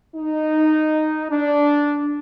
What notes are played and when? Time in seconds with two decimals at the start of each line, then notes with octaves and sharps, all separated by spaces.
0.16 D#4
1.31 D4